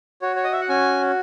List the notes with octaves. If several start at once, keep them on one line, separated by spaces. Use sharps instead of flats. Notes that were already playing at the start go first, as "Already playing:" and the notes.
F#4 C#5
C#5
D#5
E5
F#5
C#4 G#5